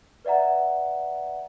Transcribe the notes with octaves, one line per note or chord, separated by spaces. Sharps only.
B4 D5 E5 F#5 A#5